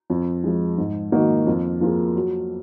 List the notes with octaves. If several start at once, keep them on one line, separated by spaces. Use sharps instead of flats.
F2
F3 G#3
G#2
D#3 A#3 D#4 F#4
F2
F3 A#3 F4 G#4
F#3